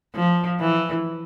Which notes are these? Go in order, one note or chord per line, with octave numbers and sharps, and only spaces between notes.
F3
E3